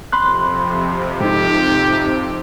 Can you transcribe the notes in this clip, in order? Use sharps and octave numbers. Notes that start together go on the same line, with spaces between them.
F2 C3 B5 C6 F#6
G#2 D#4 G4